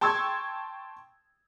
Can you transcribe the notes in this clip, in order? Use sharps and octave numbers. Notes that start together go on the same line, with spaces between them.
G5 A5 C6 C#6 E6 G#6